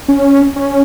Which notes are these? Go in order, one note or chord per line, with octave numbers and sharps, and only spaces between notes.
C#4
C#4